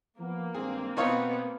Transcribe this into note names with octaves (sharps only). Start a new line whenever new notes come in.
F3 A#3 B3 A#4
G2 D#3 G#3 C4 G#4
B2 B3 C4 D#4 F4 C#5